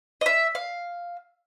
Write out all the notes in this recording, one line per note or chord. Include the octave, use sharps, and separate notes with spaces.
D#5
E5
F5